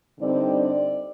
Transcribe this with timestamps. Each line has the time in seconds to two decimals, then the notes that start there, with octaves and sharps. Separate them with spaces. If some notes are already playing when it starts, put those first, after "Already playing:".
0.19 G2 D3 G3 C4 D#4 D5
0.57 D5